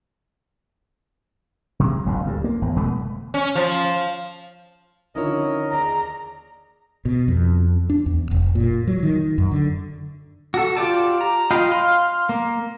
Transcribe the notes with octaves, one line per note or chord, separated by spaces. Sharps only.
C3 F#3 G#3
F#1 C#2 G#2
D2 G2
A#3
G#1 E2
F1 B2 G#3 A3
C#4
F3
D3 D#3 F3 C#4 E4 A#4 C#5 D#5
D#2 G#4 D5 A#5
B2
F2
D4
E2
F1
A#2
F#3
D#3
F#2
D3
F#4 A4
F4 G4 D5 A5
A#5
F4 D#5 F5 G5 B5
F5 C6
A#3